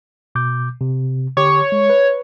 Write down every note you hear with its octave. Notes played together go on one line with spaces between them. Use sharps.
B2 D6 G6
C3
D3 G4 C#5 D6
G#3
B4